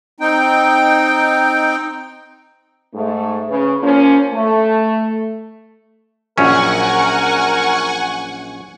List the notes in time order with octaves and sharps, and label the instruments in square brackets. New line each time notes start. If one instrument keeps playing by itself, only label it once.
[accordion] C4 D#4 G5
[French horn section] G#2 A3
C#3 B4
F3 A#3 C#4
A3
[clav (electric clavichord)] A#1 F#2 C#4 [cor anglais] A#4 [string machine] F#5 G#5 C#6